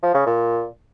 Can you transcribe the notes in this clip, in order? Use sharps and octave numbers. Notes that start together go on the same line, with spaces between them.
F3
C#3
A#2